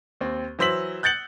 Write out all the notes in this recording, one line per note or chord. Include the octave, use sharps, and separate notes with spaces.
D#2 C4
E3 F#3 C5 E6 B6 F#7
F#6 G6 A6 C#7 F#7